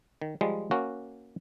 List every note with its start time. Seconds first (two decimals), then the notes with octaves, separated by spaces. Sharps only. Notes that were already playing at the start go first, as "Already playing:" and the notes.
0.22 D#3
0.41 F3 G3 G#3
0.71 A#3 C#4 F#4